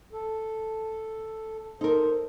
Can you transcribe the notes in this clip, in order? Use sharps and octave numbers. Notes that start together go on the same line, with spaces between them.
A4
D#4 A4 A#4 C5